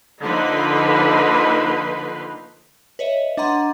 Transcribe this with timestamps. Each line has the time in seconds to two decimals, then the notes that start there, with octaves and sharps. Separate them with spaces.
0.23 D3 F3 A#3 D#4 B4 C6
2.99 B4 C#5 D#5 E5
3.37 D4 D#5 F#5 A#5 C6